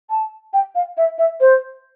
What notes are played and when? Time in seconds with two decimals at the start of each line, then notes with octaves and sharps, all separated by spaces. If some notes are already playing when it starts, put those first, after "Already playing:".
0.10 A5
0.53 G5
0.75 F5
0.97 E5
1.18 E5
1.40 C5